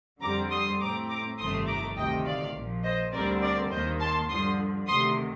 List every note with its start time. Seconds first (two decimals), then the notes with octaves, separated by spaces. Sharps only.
0.21 F2 D3 G3 C4 A#5 D6
0.51 C6 D#6
0.80 A2 A3 C4 A#5 D6
1.09 A#5 D6
1.38 G1 F2 C3 D#3 A3 C6 D#6
1.67 A#5 D6
1.96 D2 C3 D#3 D#5 G5
2.25 D5 F5
2.54 A#1 A#2 F3
2.83 C5 D#5
3.12 D2 D3 G3 C4 A#4 D5
3.42 A#4 D5
3.71 D#2 D#3 A#3 C5 D#5
4.00 A5 C6
4.29 G2 D3 F3 C6 D#6
4.87 D2 C3 D#3 C6 D#6